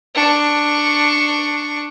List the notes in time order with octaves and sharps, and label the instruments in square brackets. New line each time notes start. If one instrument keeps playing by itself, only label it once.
[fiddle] D4 C#6